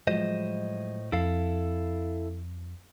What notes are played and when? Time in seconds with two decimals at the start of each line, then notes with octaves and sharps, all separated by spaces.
0.07 A2 F3 F#3 G#3 C5 D#5
1.12 F2 E4 A4 F5